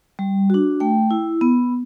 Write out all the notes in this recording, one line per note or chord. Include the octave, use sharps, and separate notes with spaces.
G3
D4 F#4
A3 G5
E4
B3